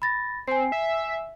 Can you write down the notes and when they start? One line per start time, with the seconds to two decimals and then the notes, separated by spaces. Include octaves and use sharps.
0.02 B5 A6 A#6
0.48 C4 G#5 C7
0.72 E5